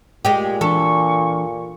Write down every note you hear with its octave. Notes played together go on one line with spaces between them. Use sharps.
A#2 G#3 G4
E3 D4 A4 C#6